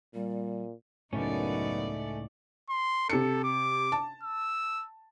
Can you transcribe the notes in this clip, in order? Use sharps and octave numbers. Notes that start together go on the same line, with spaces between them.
A#2 G3
C#2 F#2 A2 A3 B3 C#4 D#4 D5
C6
C3 A4 C#7
D6
A5
E6